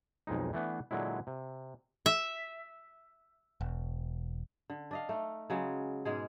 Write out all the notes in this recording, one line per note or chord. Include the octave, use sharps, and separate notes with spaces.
B1 F2 G#3 D#4
E3 A3 B3 D4
A#2 D3 F#3 G#3 E4
C3
E5
E1
D3
D4 D#5 F5
A3 D#4
C#3 F#3 G#3
G#2 B2 G#3 G#4